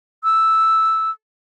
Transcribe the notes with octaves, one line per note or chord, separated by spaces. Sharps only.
E6